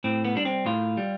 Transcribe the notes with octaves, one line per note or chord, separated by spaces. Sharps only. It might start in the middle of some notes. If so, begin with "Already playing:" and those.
A2 C4
B3
G3 D4
C4
A2 F4
G3